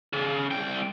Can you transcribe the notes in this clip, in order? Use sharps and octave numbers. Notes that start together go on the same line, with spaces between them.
C#3
C2 G5